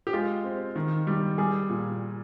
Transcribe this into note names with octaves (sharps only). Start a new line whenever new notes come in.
G4
G#3 F4
C4
D#3
G3
G3 G#4
A#2